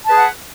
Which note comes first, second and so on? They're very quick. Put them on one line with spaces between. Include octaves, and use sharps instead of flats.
A5 B4 G#4 F#5